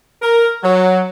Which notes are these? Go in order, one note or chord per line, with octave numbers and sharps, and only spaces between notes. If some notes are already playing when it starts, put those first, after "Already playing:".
A#4
F#3